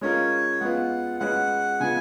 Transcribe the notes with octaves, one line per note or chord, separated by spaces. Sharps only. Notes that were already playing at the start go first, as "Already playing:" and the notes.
G#3 C#4 F4 A#4 C#5
G#3 B3 F4 B4 F#5
G#3 C#4 F#4 B4 F#5
C#3 G#3 B3 F4 G#5